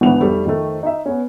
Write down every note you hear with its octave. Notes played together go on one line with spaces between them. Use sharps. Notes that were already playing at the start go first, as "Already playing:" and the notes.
G#1 D2 E3 B3 F7
F1 G3 A3
F2 D#3 A3
D#4 E5
B3 C#4